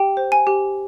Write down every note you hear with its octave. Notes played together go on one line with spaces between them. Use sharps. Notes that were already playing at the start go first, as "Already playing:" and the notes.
Already playing: G4 G5
C5
G#5
G4